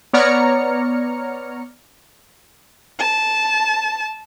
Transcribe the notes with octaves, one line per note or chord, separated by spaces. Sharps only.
B3 C#5 D5 A#5 F6 C#7
A5